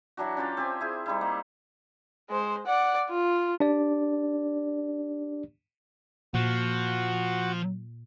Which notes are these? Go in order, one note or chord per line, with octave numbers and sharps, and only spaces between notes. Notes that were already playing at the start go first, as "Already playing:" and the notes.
E3 F#3 D4 F#4
C#4 F4 G4 A5
C4 G4 C5 G#5
E4 G#4
G3 D#4 E4
A#3
G#3 C5
D5 F#5
F4
D4 G4 D5
A#2 F3 F#4 F#5